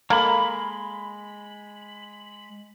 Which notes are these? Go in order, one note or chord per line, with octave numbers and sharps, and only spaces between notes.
G#3 A#3 A4 A#4 B5